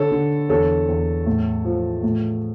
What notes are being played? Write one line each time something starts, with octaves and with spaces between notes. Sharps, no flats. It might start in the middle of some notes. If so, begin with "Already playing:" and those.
Already playing: D3 A4 C#5
D3
E2 A4 C#5
E2
A2
F3
A2